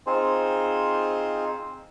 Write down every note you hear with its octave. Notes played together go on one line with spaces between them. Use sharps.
C4 D#4 F4 G#4 C5